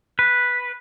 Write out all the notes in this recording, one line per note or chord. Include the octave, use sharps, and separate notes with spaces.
B4